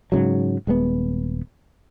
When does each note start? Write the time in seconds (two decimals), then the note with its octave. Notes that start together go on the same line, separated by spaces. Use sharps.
0.12 G#2 C#3 F#3
0.67 D#1 G#3 A3 B3